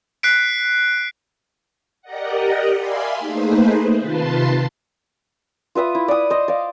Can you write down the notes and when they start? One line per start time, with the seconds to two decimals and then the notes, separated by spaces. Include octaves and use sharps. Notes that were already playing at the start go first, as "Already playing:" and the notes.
0.23 F#6 B6 C7 D7
2.02 G4 A#4 D5 D#5 F#5
2.76 D5 E5 F5 G#5 B5 C6
3.18 A3 A#3 D#4 G#4 B4 C5
4.00 C3 D#3 F4 B4 A5 C6
5.75 F4 B4 E5 D#6
5.95 E4
6.08 D5 D#6
6.30 C5 D#5
6.48 D5 F5